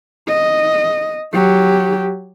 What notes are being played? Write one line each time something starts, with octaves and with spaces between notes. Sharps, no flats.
D#5
F#3 G4